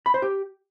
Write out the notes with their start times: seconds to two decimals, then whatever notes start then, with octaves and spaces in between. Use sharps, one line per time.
0.06 B5
0.14 C5
0.22 G4